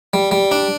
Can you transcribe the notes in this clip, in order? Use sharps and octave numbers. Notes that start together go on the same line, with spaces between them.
G3
G3
D4